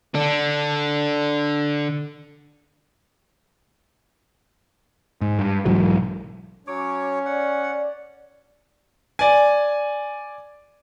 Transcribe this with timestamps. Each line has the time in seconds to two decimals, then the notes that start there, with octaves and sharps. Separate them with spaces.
0.14 D3 D4
5.21 G#2
5.39 G2
5.65 B1 G#2 E3 F#3
6.67 F#3 C#4 C#5 D6
7.26 D5 F#5
9.19 D5 G#5